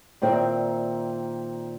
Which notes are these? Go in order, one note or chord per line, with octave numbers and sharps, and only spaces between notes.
A#2 D#3 C4 D5 E5